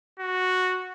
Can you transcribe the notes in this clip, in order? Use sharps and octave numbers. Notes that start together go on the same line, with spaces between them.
F#4